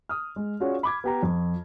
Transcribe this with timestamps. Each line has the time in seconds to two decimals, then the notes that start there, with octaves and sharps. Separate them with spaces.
0.09 D#6 F6
0.36 G#3
0.60 C#4 F4 F#4 G#4 C#5 D5
0.83 B5 D6 G#6
1.04 B3 G4 A#5
1.23 F2